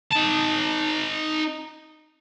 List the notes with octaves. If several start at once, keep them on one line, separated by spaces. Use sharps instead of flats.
D#4 A5